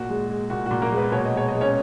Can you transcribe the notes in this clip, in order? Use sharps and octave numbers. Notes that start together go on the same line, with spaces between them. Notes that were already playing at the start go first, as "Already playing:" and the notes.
Already playing: A#2 F#4
G#3
G#3
A#2 F#4
A#2 F#4
A#3 A#4
G#3
B3 B4
B2 C#5
D#5
G#3 C#5
D#5
G#3
C#4 C#5